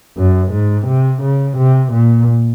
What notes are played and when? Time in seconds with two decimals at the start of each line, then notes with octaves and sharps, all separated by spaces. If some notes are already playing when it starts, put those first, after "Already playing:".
0.17 F#2
0.52 G#2
0.87 C3
1.22 C#3
1.57 C3
1.93 A#2